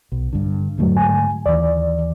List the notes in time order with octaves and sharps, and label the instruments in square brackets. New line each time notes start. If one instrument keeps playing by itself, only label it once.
[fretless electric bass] B1
G2 D3
[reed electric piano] E2 F#3 [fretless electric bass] G#2 D3 A3
[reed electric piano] G#5
[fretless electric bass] D#2 E3 [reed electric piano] D5